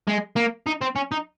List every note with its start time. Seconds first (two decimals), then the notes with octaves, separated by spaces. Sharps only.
0.07 G#3
0.36 A#3
0.67 D#4
0.82 C4
0.96 C#4
1.12 D#4